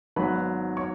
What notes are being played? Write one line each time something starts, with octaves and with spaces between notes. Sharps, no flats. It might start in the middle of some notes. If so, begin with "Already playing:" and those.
G#1 G#2 F#3 B3 B4 B5
C#5 C#6